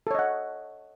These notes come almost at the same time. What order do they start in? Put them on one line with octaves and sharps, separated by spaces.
A4 C#5 D#5 F#5